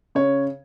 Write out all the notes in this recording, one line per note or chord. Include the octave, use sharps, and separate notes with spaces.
C#3 C#5